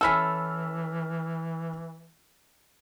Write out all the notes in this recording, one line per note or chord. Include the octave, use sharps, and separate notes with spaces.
E3 C#4 E4 A4 E6 F6 B6